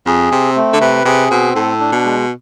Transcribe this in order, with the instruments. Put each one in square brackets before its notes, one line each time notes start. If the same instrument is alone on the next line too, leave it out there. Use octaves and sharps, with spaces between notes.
[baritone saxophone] F2 [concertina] G#4
[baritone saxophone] C3 [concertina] C4
[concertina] A3
[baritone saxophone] D3
[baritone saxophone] C3 [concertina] B4
[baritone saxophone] C3 [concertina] G#4
[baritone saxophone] B2 [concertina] C4
[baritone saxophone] A2 [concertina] A4
[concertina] D4
[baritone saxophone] B2
[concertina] G#3